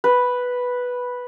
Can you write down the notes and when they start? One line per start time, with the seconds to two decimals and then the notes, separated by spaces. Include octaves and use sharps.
0.04 B4